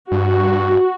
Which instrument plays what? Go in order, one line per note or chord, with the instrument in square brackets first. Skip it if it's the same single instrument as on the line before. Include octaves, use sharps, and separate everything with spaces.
[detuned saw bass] G2 [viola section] F#4